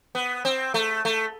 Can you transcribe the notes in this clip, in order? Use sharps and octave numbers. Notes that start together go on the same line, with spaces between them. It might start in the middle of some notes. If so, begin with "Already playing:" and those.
B3
C4
A3
A3